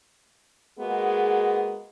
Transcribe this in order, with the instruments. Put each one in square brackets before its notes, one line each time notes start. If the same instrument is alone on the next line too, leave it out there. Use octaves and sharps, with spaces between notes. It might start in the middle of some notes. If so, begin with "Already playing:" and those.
[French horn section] G#3 A#3 B3 F#4 G#4